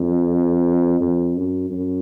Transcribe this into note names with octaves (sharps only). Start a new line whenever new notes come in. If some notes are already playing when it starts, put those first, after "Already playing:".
Already playing: F2
F2
F#2
F#2